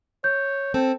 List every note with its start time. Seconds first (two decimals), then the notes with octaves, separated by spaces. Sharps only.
0.24 C#5 G6
0.74 C4 A4